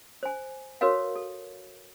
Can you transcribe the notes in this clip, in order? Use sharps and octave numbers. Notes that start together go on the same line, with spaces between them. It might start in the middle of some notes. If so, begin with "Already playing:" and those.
C5 G#5
F#4 A#4 B4 C#5 F5
A4